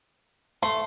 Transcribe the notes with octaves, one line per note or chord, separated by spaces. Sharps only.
A3 C6